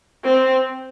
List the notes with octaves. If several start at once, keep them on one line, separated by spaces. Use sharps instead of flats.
C4